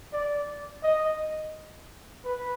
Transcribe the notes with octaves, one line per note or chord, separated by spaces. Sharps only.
D5
D#5
B4